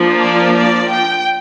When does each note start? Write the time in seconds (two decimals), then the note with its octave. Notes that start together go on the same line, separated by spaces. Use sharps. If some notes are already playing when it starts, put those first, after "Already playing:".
Already playing: F3 A#3 D4
0.20 D5
0.55 D5
0.89 G5